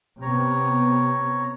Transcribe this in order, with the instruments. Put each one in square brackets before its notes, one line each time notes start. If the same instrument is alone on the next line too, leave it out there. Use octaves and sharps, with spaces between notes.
[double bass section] C3 B3 [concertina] C#5 A#5